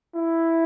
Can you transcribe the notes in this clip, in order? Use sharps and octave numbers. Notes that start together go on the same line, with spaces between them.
E4